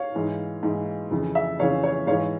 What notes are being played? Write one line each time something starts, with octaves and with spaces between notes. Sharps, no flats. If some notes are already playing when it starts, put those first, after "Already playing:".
Already playing: C#5 F5
G#2 E3
G#2 E3
F2 C#3 E3
E5
F2 C#3 E3 C#5 F5
C#5
G#2 E3 C#5 F5